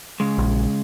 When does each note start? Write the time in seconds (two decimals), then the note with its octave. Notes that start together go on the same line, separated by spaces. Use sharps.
0.20 C#3 G#3
0.38 A#1